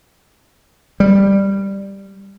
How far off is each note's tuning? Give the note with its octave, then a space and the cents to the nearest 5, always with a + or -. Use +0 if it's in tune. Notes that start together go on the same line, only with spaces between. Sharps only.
G3 +5